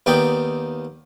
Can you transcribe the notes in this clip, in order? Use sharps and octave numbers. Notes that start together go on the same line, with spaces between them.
D#2 B3 D#4 D5 G5 B5